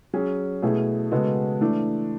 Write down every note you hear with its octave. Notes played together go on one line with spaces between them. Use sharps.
F#3 C#4 G#4
B2 A3 E4 G#4
C#3 G#3 B3 F#4 A4
E3 A3 D4